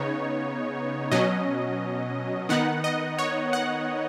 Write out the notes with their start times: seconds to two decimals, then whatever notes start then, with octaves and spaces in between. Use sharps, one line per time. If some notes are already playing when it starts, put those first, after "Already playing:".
Already playing: C#3 B3 D#4 C#5
1.12 B2 F#3 C#4 D#5
2.49 D#3 B3 D#4 F#5
2.84 D#5
3.18 C#5
3.53 F#5